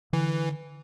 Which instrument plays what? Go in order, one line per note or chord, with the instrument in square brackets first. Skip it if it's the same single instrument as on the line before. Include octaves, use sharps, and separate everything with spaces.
[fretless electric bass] D3 [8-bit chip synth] E3